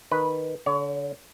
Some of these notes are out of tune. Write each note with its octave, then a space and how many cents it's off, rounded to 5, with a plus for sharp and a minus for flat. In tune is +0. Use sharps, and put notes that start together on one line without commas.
D#3 +0 B4 -5
D3 -25 C#5 +35 A#5 +0